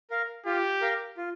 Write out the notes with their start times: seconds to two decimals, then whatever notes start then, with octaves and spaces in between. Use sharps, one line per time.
0.10 A#4 F5
0.46 F4 G4
0.81 A#4 F5
1.17 F4